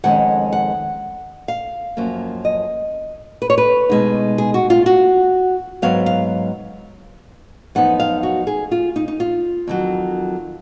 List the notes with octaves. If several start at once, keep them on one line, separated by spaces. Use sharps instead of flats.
F2 D#3 G#3 C#4 F#5
F#5
F5
F#2 F3 A#3 C#4
D#5
B4
C#5
B4
B2 G#3 D#4
G#4
F#4
F4
F#4
G#2 F#3 B3 F5
F5
F#2 F3 B3 D#4 F#5
F5
F#4
G#4
F4
D#4
D#4
F4
F2 D#3 F#3